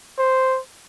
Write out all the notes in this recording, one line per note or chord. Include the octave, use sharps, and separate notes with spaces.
C5